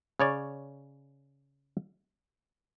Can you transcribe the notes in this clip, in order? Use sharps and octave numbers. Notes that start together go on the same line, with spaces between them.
C#3 C#5 D5